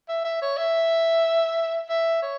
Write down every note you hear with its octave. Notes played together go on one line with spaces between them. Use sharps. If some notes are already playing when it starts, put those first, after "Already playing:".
E5
E5
C#5
E5
E5
C#5